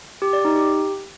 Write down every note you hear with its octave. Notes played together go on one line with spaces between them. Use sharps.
G4
D5
D#4
G4